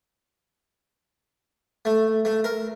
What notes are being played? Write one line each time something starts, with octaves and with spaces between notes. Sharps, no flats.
A3
A3
A#4